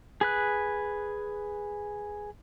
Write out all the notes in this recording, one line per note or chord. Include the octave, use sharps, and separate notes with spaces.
G#4 B4 F#6